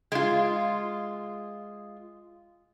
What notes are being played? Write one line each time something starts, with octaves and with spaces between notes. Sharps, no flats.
G#3 F4